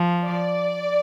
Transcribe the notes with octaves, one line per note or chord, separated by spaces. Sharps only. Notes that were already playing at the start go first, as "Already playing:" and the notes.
Already playing: F3
D5